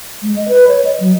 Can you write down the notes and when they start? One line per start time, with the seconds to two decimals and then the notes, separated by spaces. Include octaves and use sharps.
0.23 G#3
0.36 D#5
0.48 B4
0.68 C#5
0.85 D#5
1.00 F#3